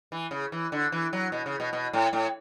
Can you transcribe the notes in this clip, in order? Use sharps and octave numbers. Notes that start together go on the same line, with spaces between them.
E3
C#3
E3
D3
E3
F#3
B2
C#3
B2
B2
A2
A2